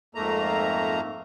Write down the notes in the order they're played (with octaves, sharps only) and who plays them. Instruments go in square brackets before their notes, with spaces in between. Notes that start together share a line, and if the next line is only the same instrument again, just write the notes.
[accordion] F2 G#2 A3 A#3 A#5